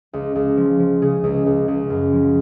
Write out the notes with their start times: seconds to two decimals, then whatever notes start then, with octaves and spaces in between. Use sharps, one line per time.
0.13 C#2
0.35 C#2
0.57 F3
0.79 F3
1.02 C#3 G#4
1.24 C#2
1.46 C#2
1.68 C#2
1.90 F#2
2.13 F3